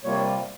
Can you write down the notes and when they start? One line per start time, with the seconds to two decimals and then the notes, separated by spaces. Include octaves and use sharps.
0.04 C3 G3 A#3 F4 C#5